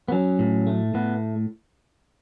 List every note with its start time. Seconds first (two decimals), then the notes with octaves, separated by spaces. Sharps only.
0.08 B3
0.12 F#3 C#4
0.39 A2
0.67 A3
0.94 A2 B3